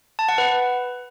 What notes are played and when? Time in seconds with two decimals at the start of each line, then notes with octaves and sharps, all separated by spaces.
0.19 A5
0.29 F#5
0.38 B4